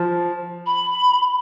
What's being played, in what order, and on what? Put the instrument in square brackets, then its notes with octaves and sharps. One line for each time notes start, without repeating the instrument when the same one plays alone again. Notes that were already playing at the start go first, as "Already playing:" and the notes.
Already playing: [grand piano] F3
[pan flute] B5